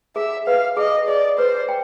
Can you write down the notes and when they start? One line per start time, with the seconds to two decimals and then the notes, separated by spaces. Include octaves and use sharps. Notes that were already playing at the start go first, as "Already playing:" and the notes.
0.16 G#4 E5
0.47 B4 F5
0.77 G#4 D#5
1.08 G#4 D5
1.38 B4 C5
1.69 G5